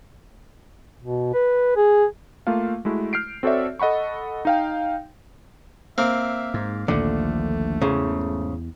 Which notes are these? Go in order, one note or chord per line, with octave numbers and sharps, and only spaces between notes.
B2
B4
G#4
A3 A#3 F4 F5
G#3 A3 E4 F#4
F6 G6 C7 D7
C4 F#4 A4 C#5 D5 E5
A4 D#5 F#5 B5 C#6
D#4 F5 G5
A#3 C4 E5
G#2
A#1 D#2 D3 F3 A3
E2 G#2 C#3